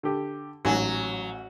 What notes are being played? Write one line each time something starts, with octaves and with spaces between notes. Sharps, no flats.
D3 G4
A1 G#2 F#3 G#5